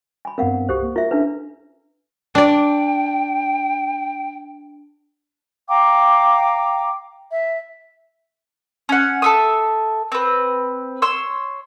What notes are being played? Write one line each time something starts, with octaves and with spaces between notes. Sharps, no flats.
G#5 B5
G2 B3 C4 A#4 F5 F#5
C2 G4 A4 C5
A#3
F4 A#4 E5
C#4 D4 E4 A4 B4 E5
D4 D5 G5
F5 G5 A#5 D6
E5
C#4 F#5
A4 E5 D#6
C4 B4
C#5 C6 E6